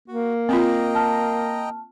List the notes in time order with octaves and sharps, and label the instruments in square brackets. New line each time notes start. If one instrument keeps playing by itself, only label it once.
[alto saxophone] A#3 [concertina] F#4
[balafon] C4 F4 [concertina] D#5 G5 A#5
[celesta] A5 F6